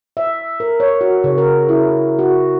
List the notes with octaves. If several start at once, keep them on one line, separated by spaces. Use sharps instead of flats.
E5
A#4
C#5
F#4
C#3
A#4
E4
F#4